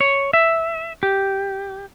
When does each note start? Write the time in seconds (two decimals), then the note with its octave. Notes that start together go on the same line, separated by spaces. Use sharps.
0.01 C#5
0.33 E5
1.03 G4